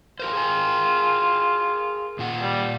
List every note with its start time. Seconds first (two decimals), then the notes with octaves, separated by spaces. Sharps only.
0.20 F4 G4 A#4 C5
0.33 G#4 A#4 G#5
2.19 A#2 F4 F#5
2.42 G3